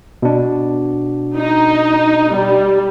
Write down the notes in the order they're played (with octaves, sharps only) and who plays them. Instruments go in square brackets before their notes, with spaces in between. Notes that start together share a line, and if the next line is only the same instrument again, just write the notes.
[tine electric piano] B2 D4
[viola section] D#4
G3